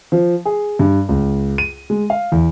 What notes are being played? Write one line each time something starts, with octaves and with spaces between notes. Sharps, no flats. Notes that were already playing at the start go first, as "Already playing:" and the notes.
F3
G#4
G2
C#2
D#7
G#3
F5
E2